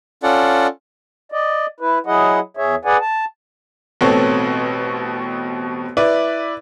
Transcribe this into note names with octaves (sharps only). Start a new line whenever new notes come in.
C#4 F4 A4 D5 F#5
D5 D#5
E4 B4
F#3 E4 G#4 D#5 F#5
E2 G#4 C#5 E5
G#4 B4 D5 F#5 G#5
A5
A1 B2 C4 A4 C#5
E4 B4 D5